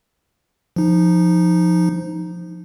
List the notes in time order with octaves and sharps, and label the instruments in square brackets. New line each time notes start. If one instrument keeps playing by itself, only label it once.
[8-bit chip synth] F3 D#4